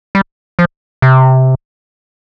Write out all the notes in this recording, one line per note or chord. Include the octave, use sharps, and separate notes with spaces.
G3
F3
C3